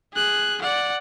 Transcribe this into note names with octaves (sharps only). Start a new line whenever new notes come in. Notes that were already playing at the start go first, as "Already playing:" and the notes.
G#4 F#6
D5 F#5